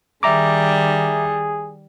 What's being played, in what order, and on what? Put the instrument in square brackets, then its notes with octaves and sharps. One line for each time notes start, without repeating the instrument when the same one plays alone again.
[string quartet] D#3 G3 [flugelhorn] G#4 [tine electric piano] E5 A#5 D6